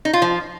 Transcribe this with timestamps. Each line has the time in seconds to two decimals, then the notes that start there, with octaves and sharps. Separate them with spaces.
0.05 D#4
0.13 F4
0.22 F3